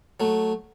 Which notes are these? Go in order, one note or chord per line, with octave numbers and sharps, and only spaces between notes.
F#3 A3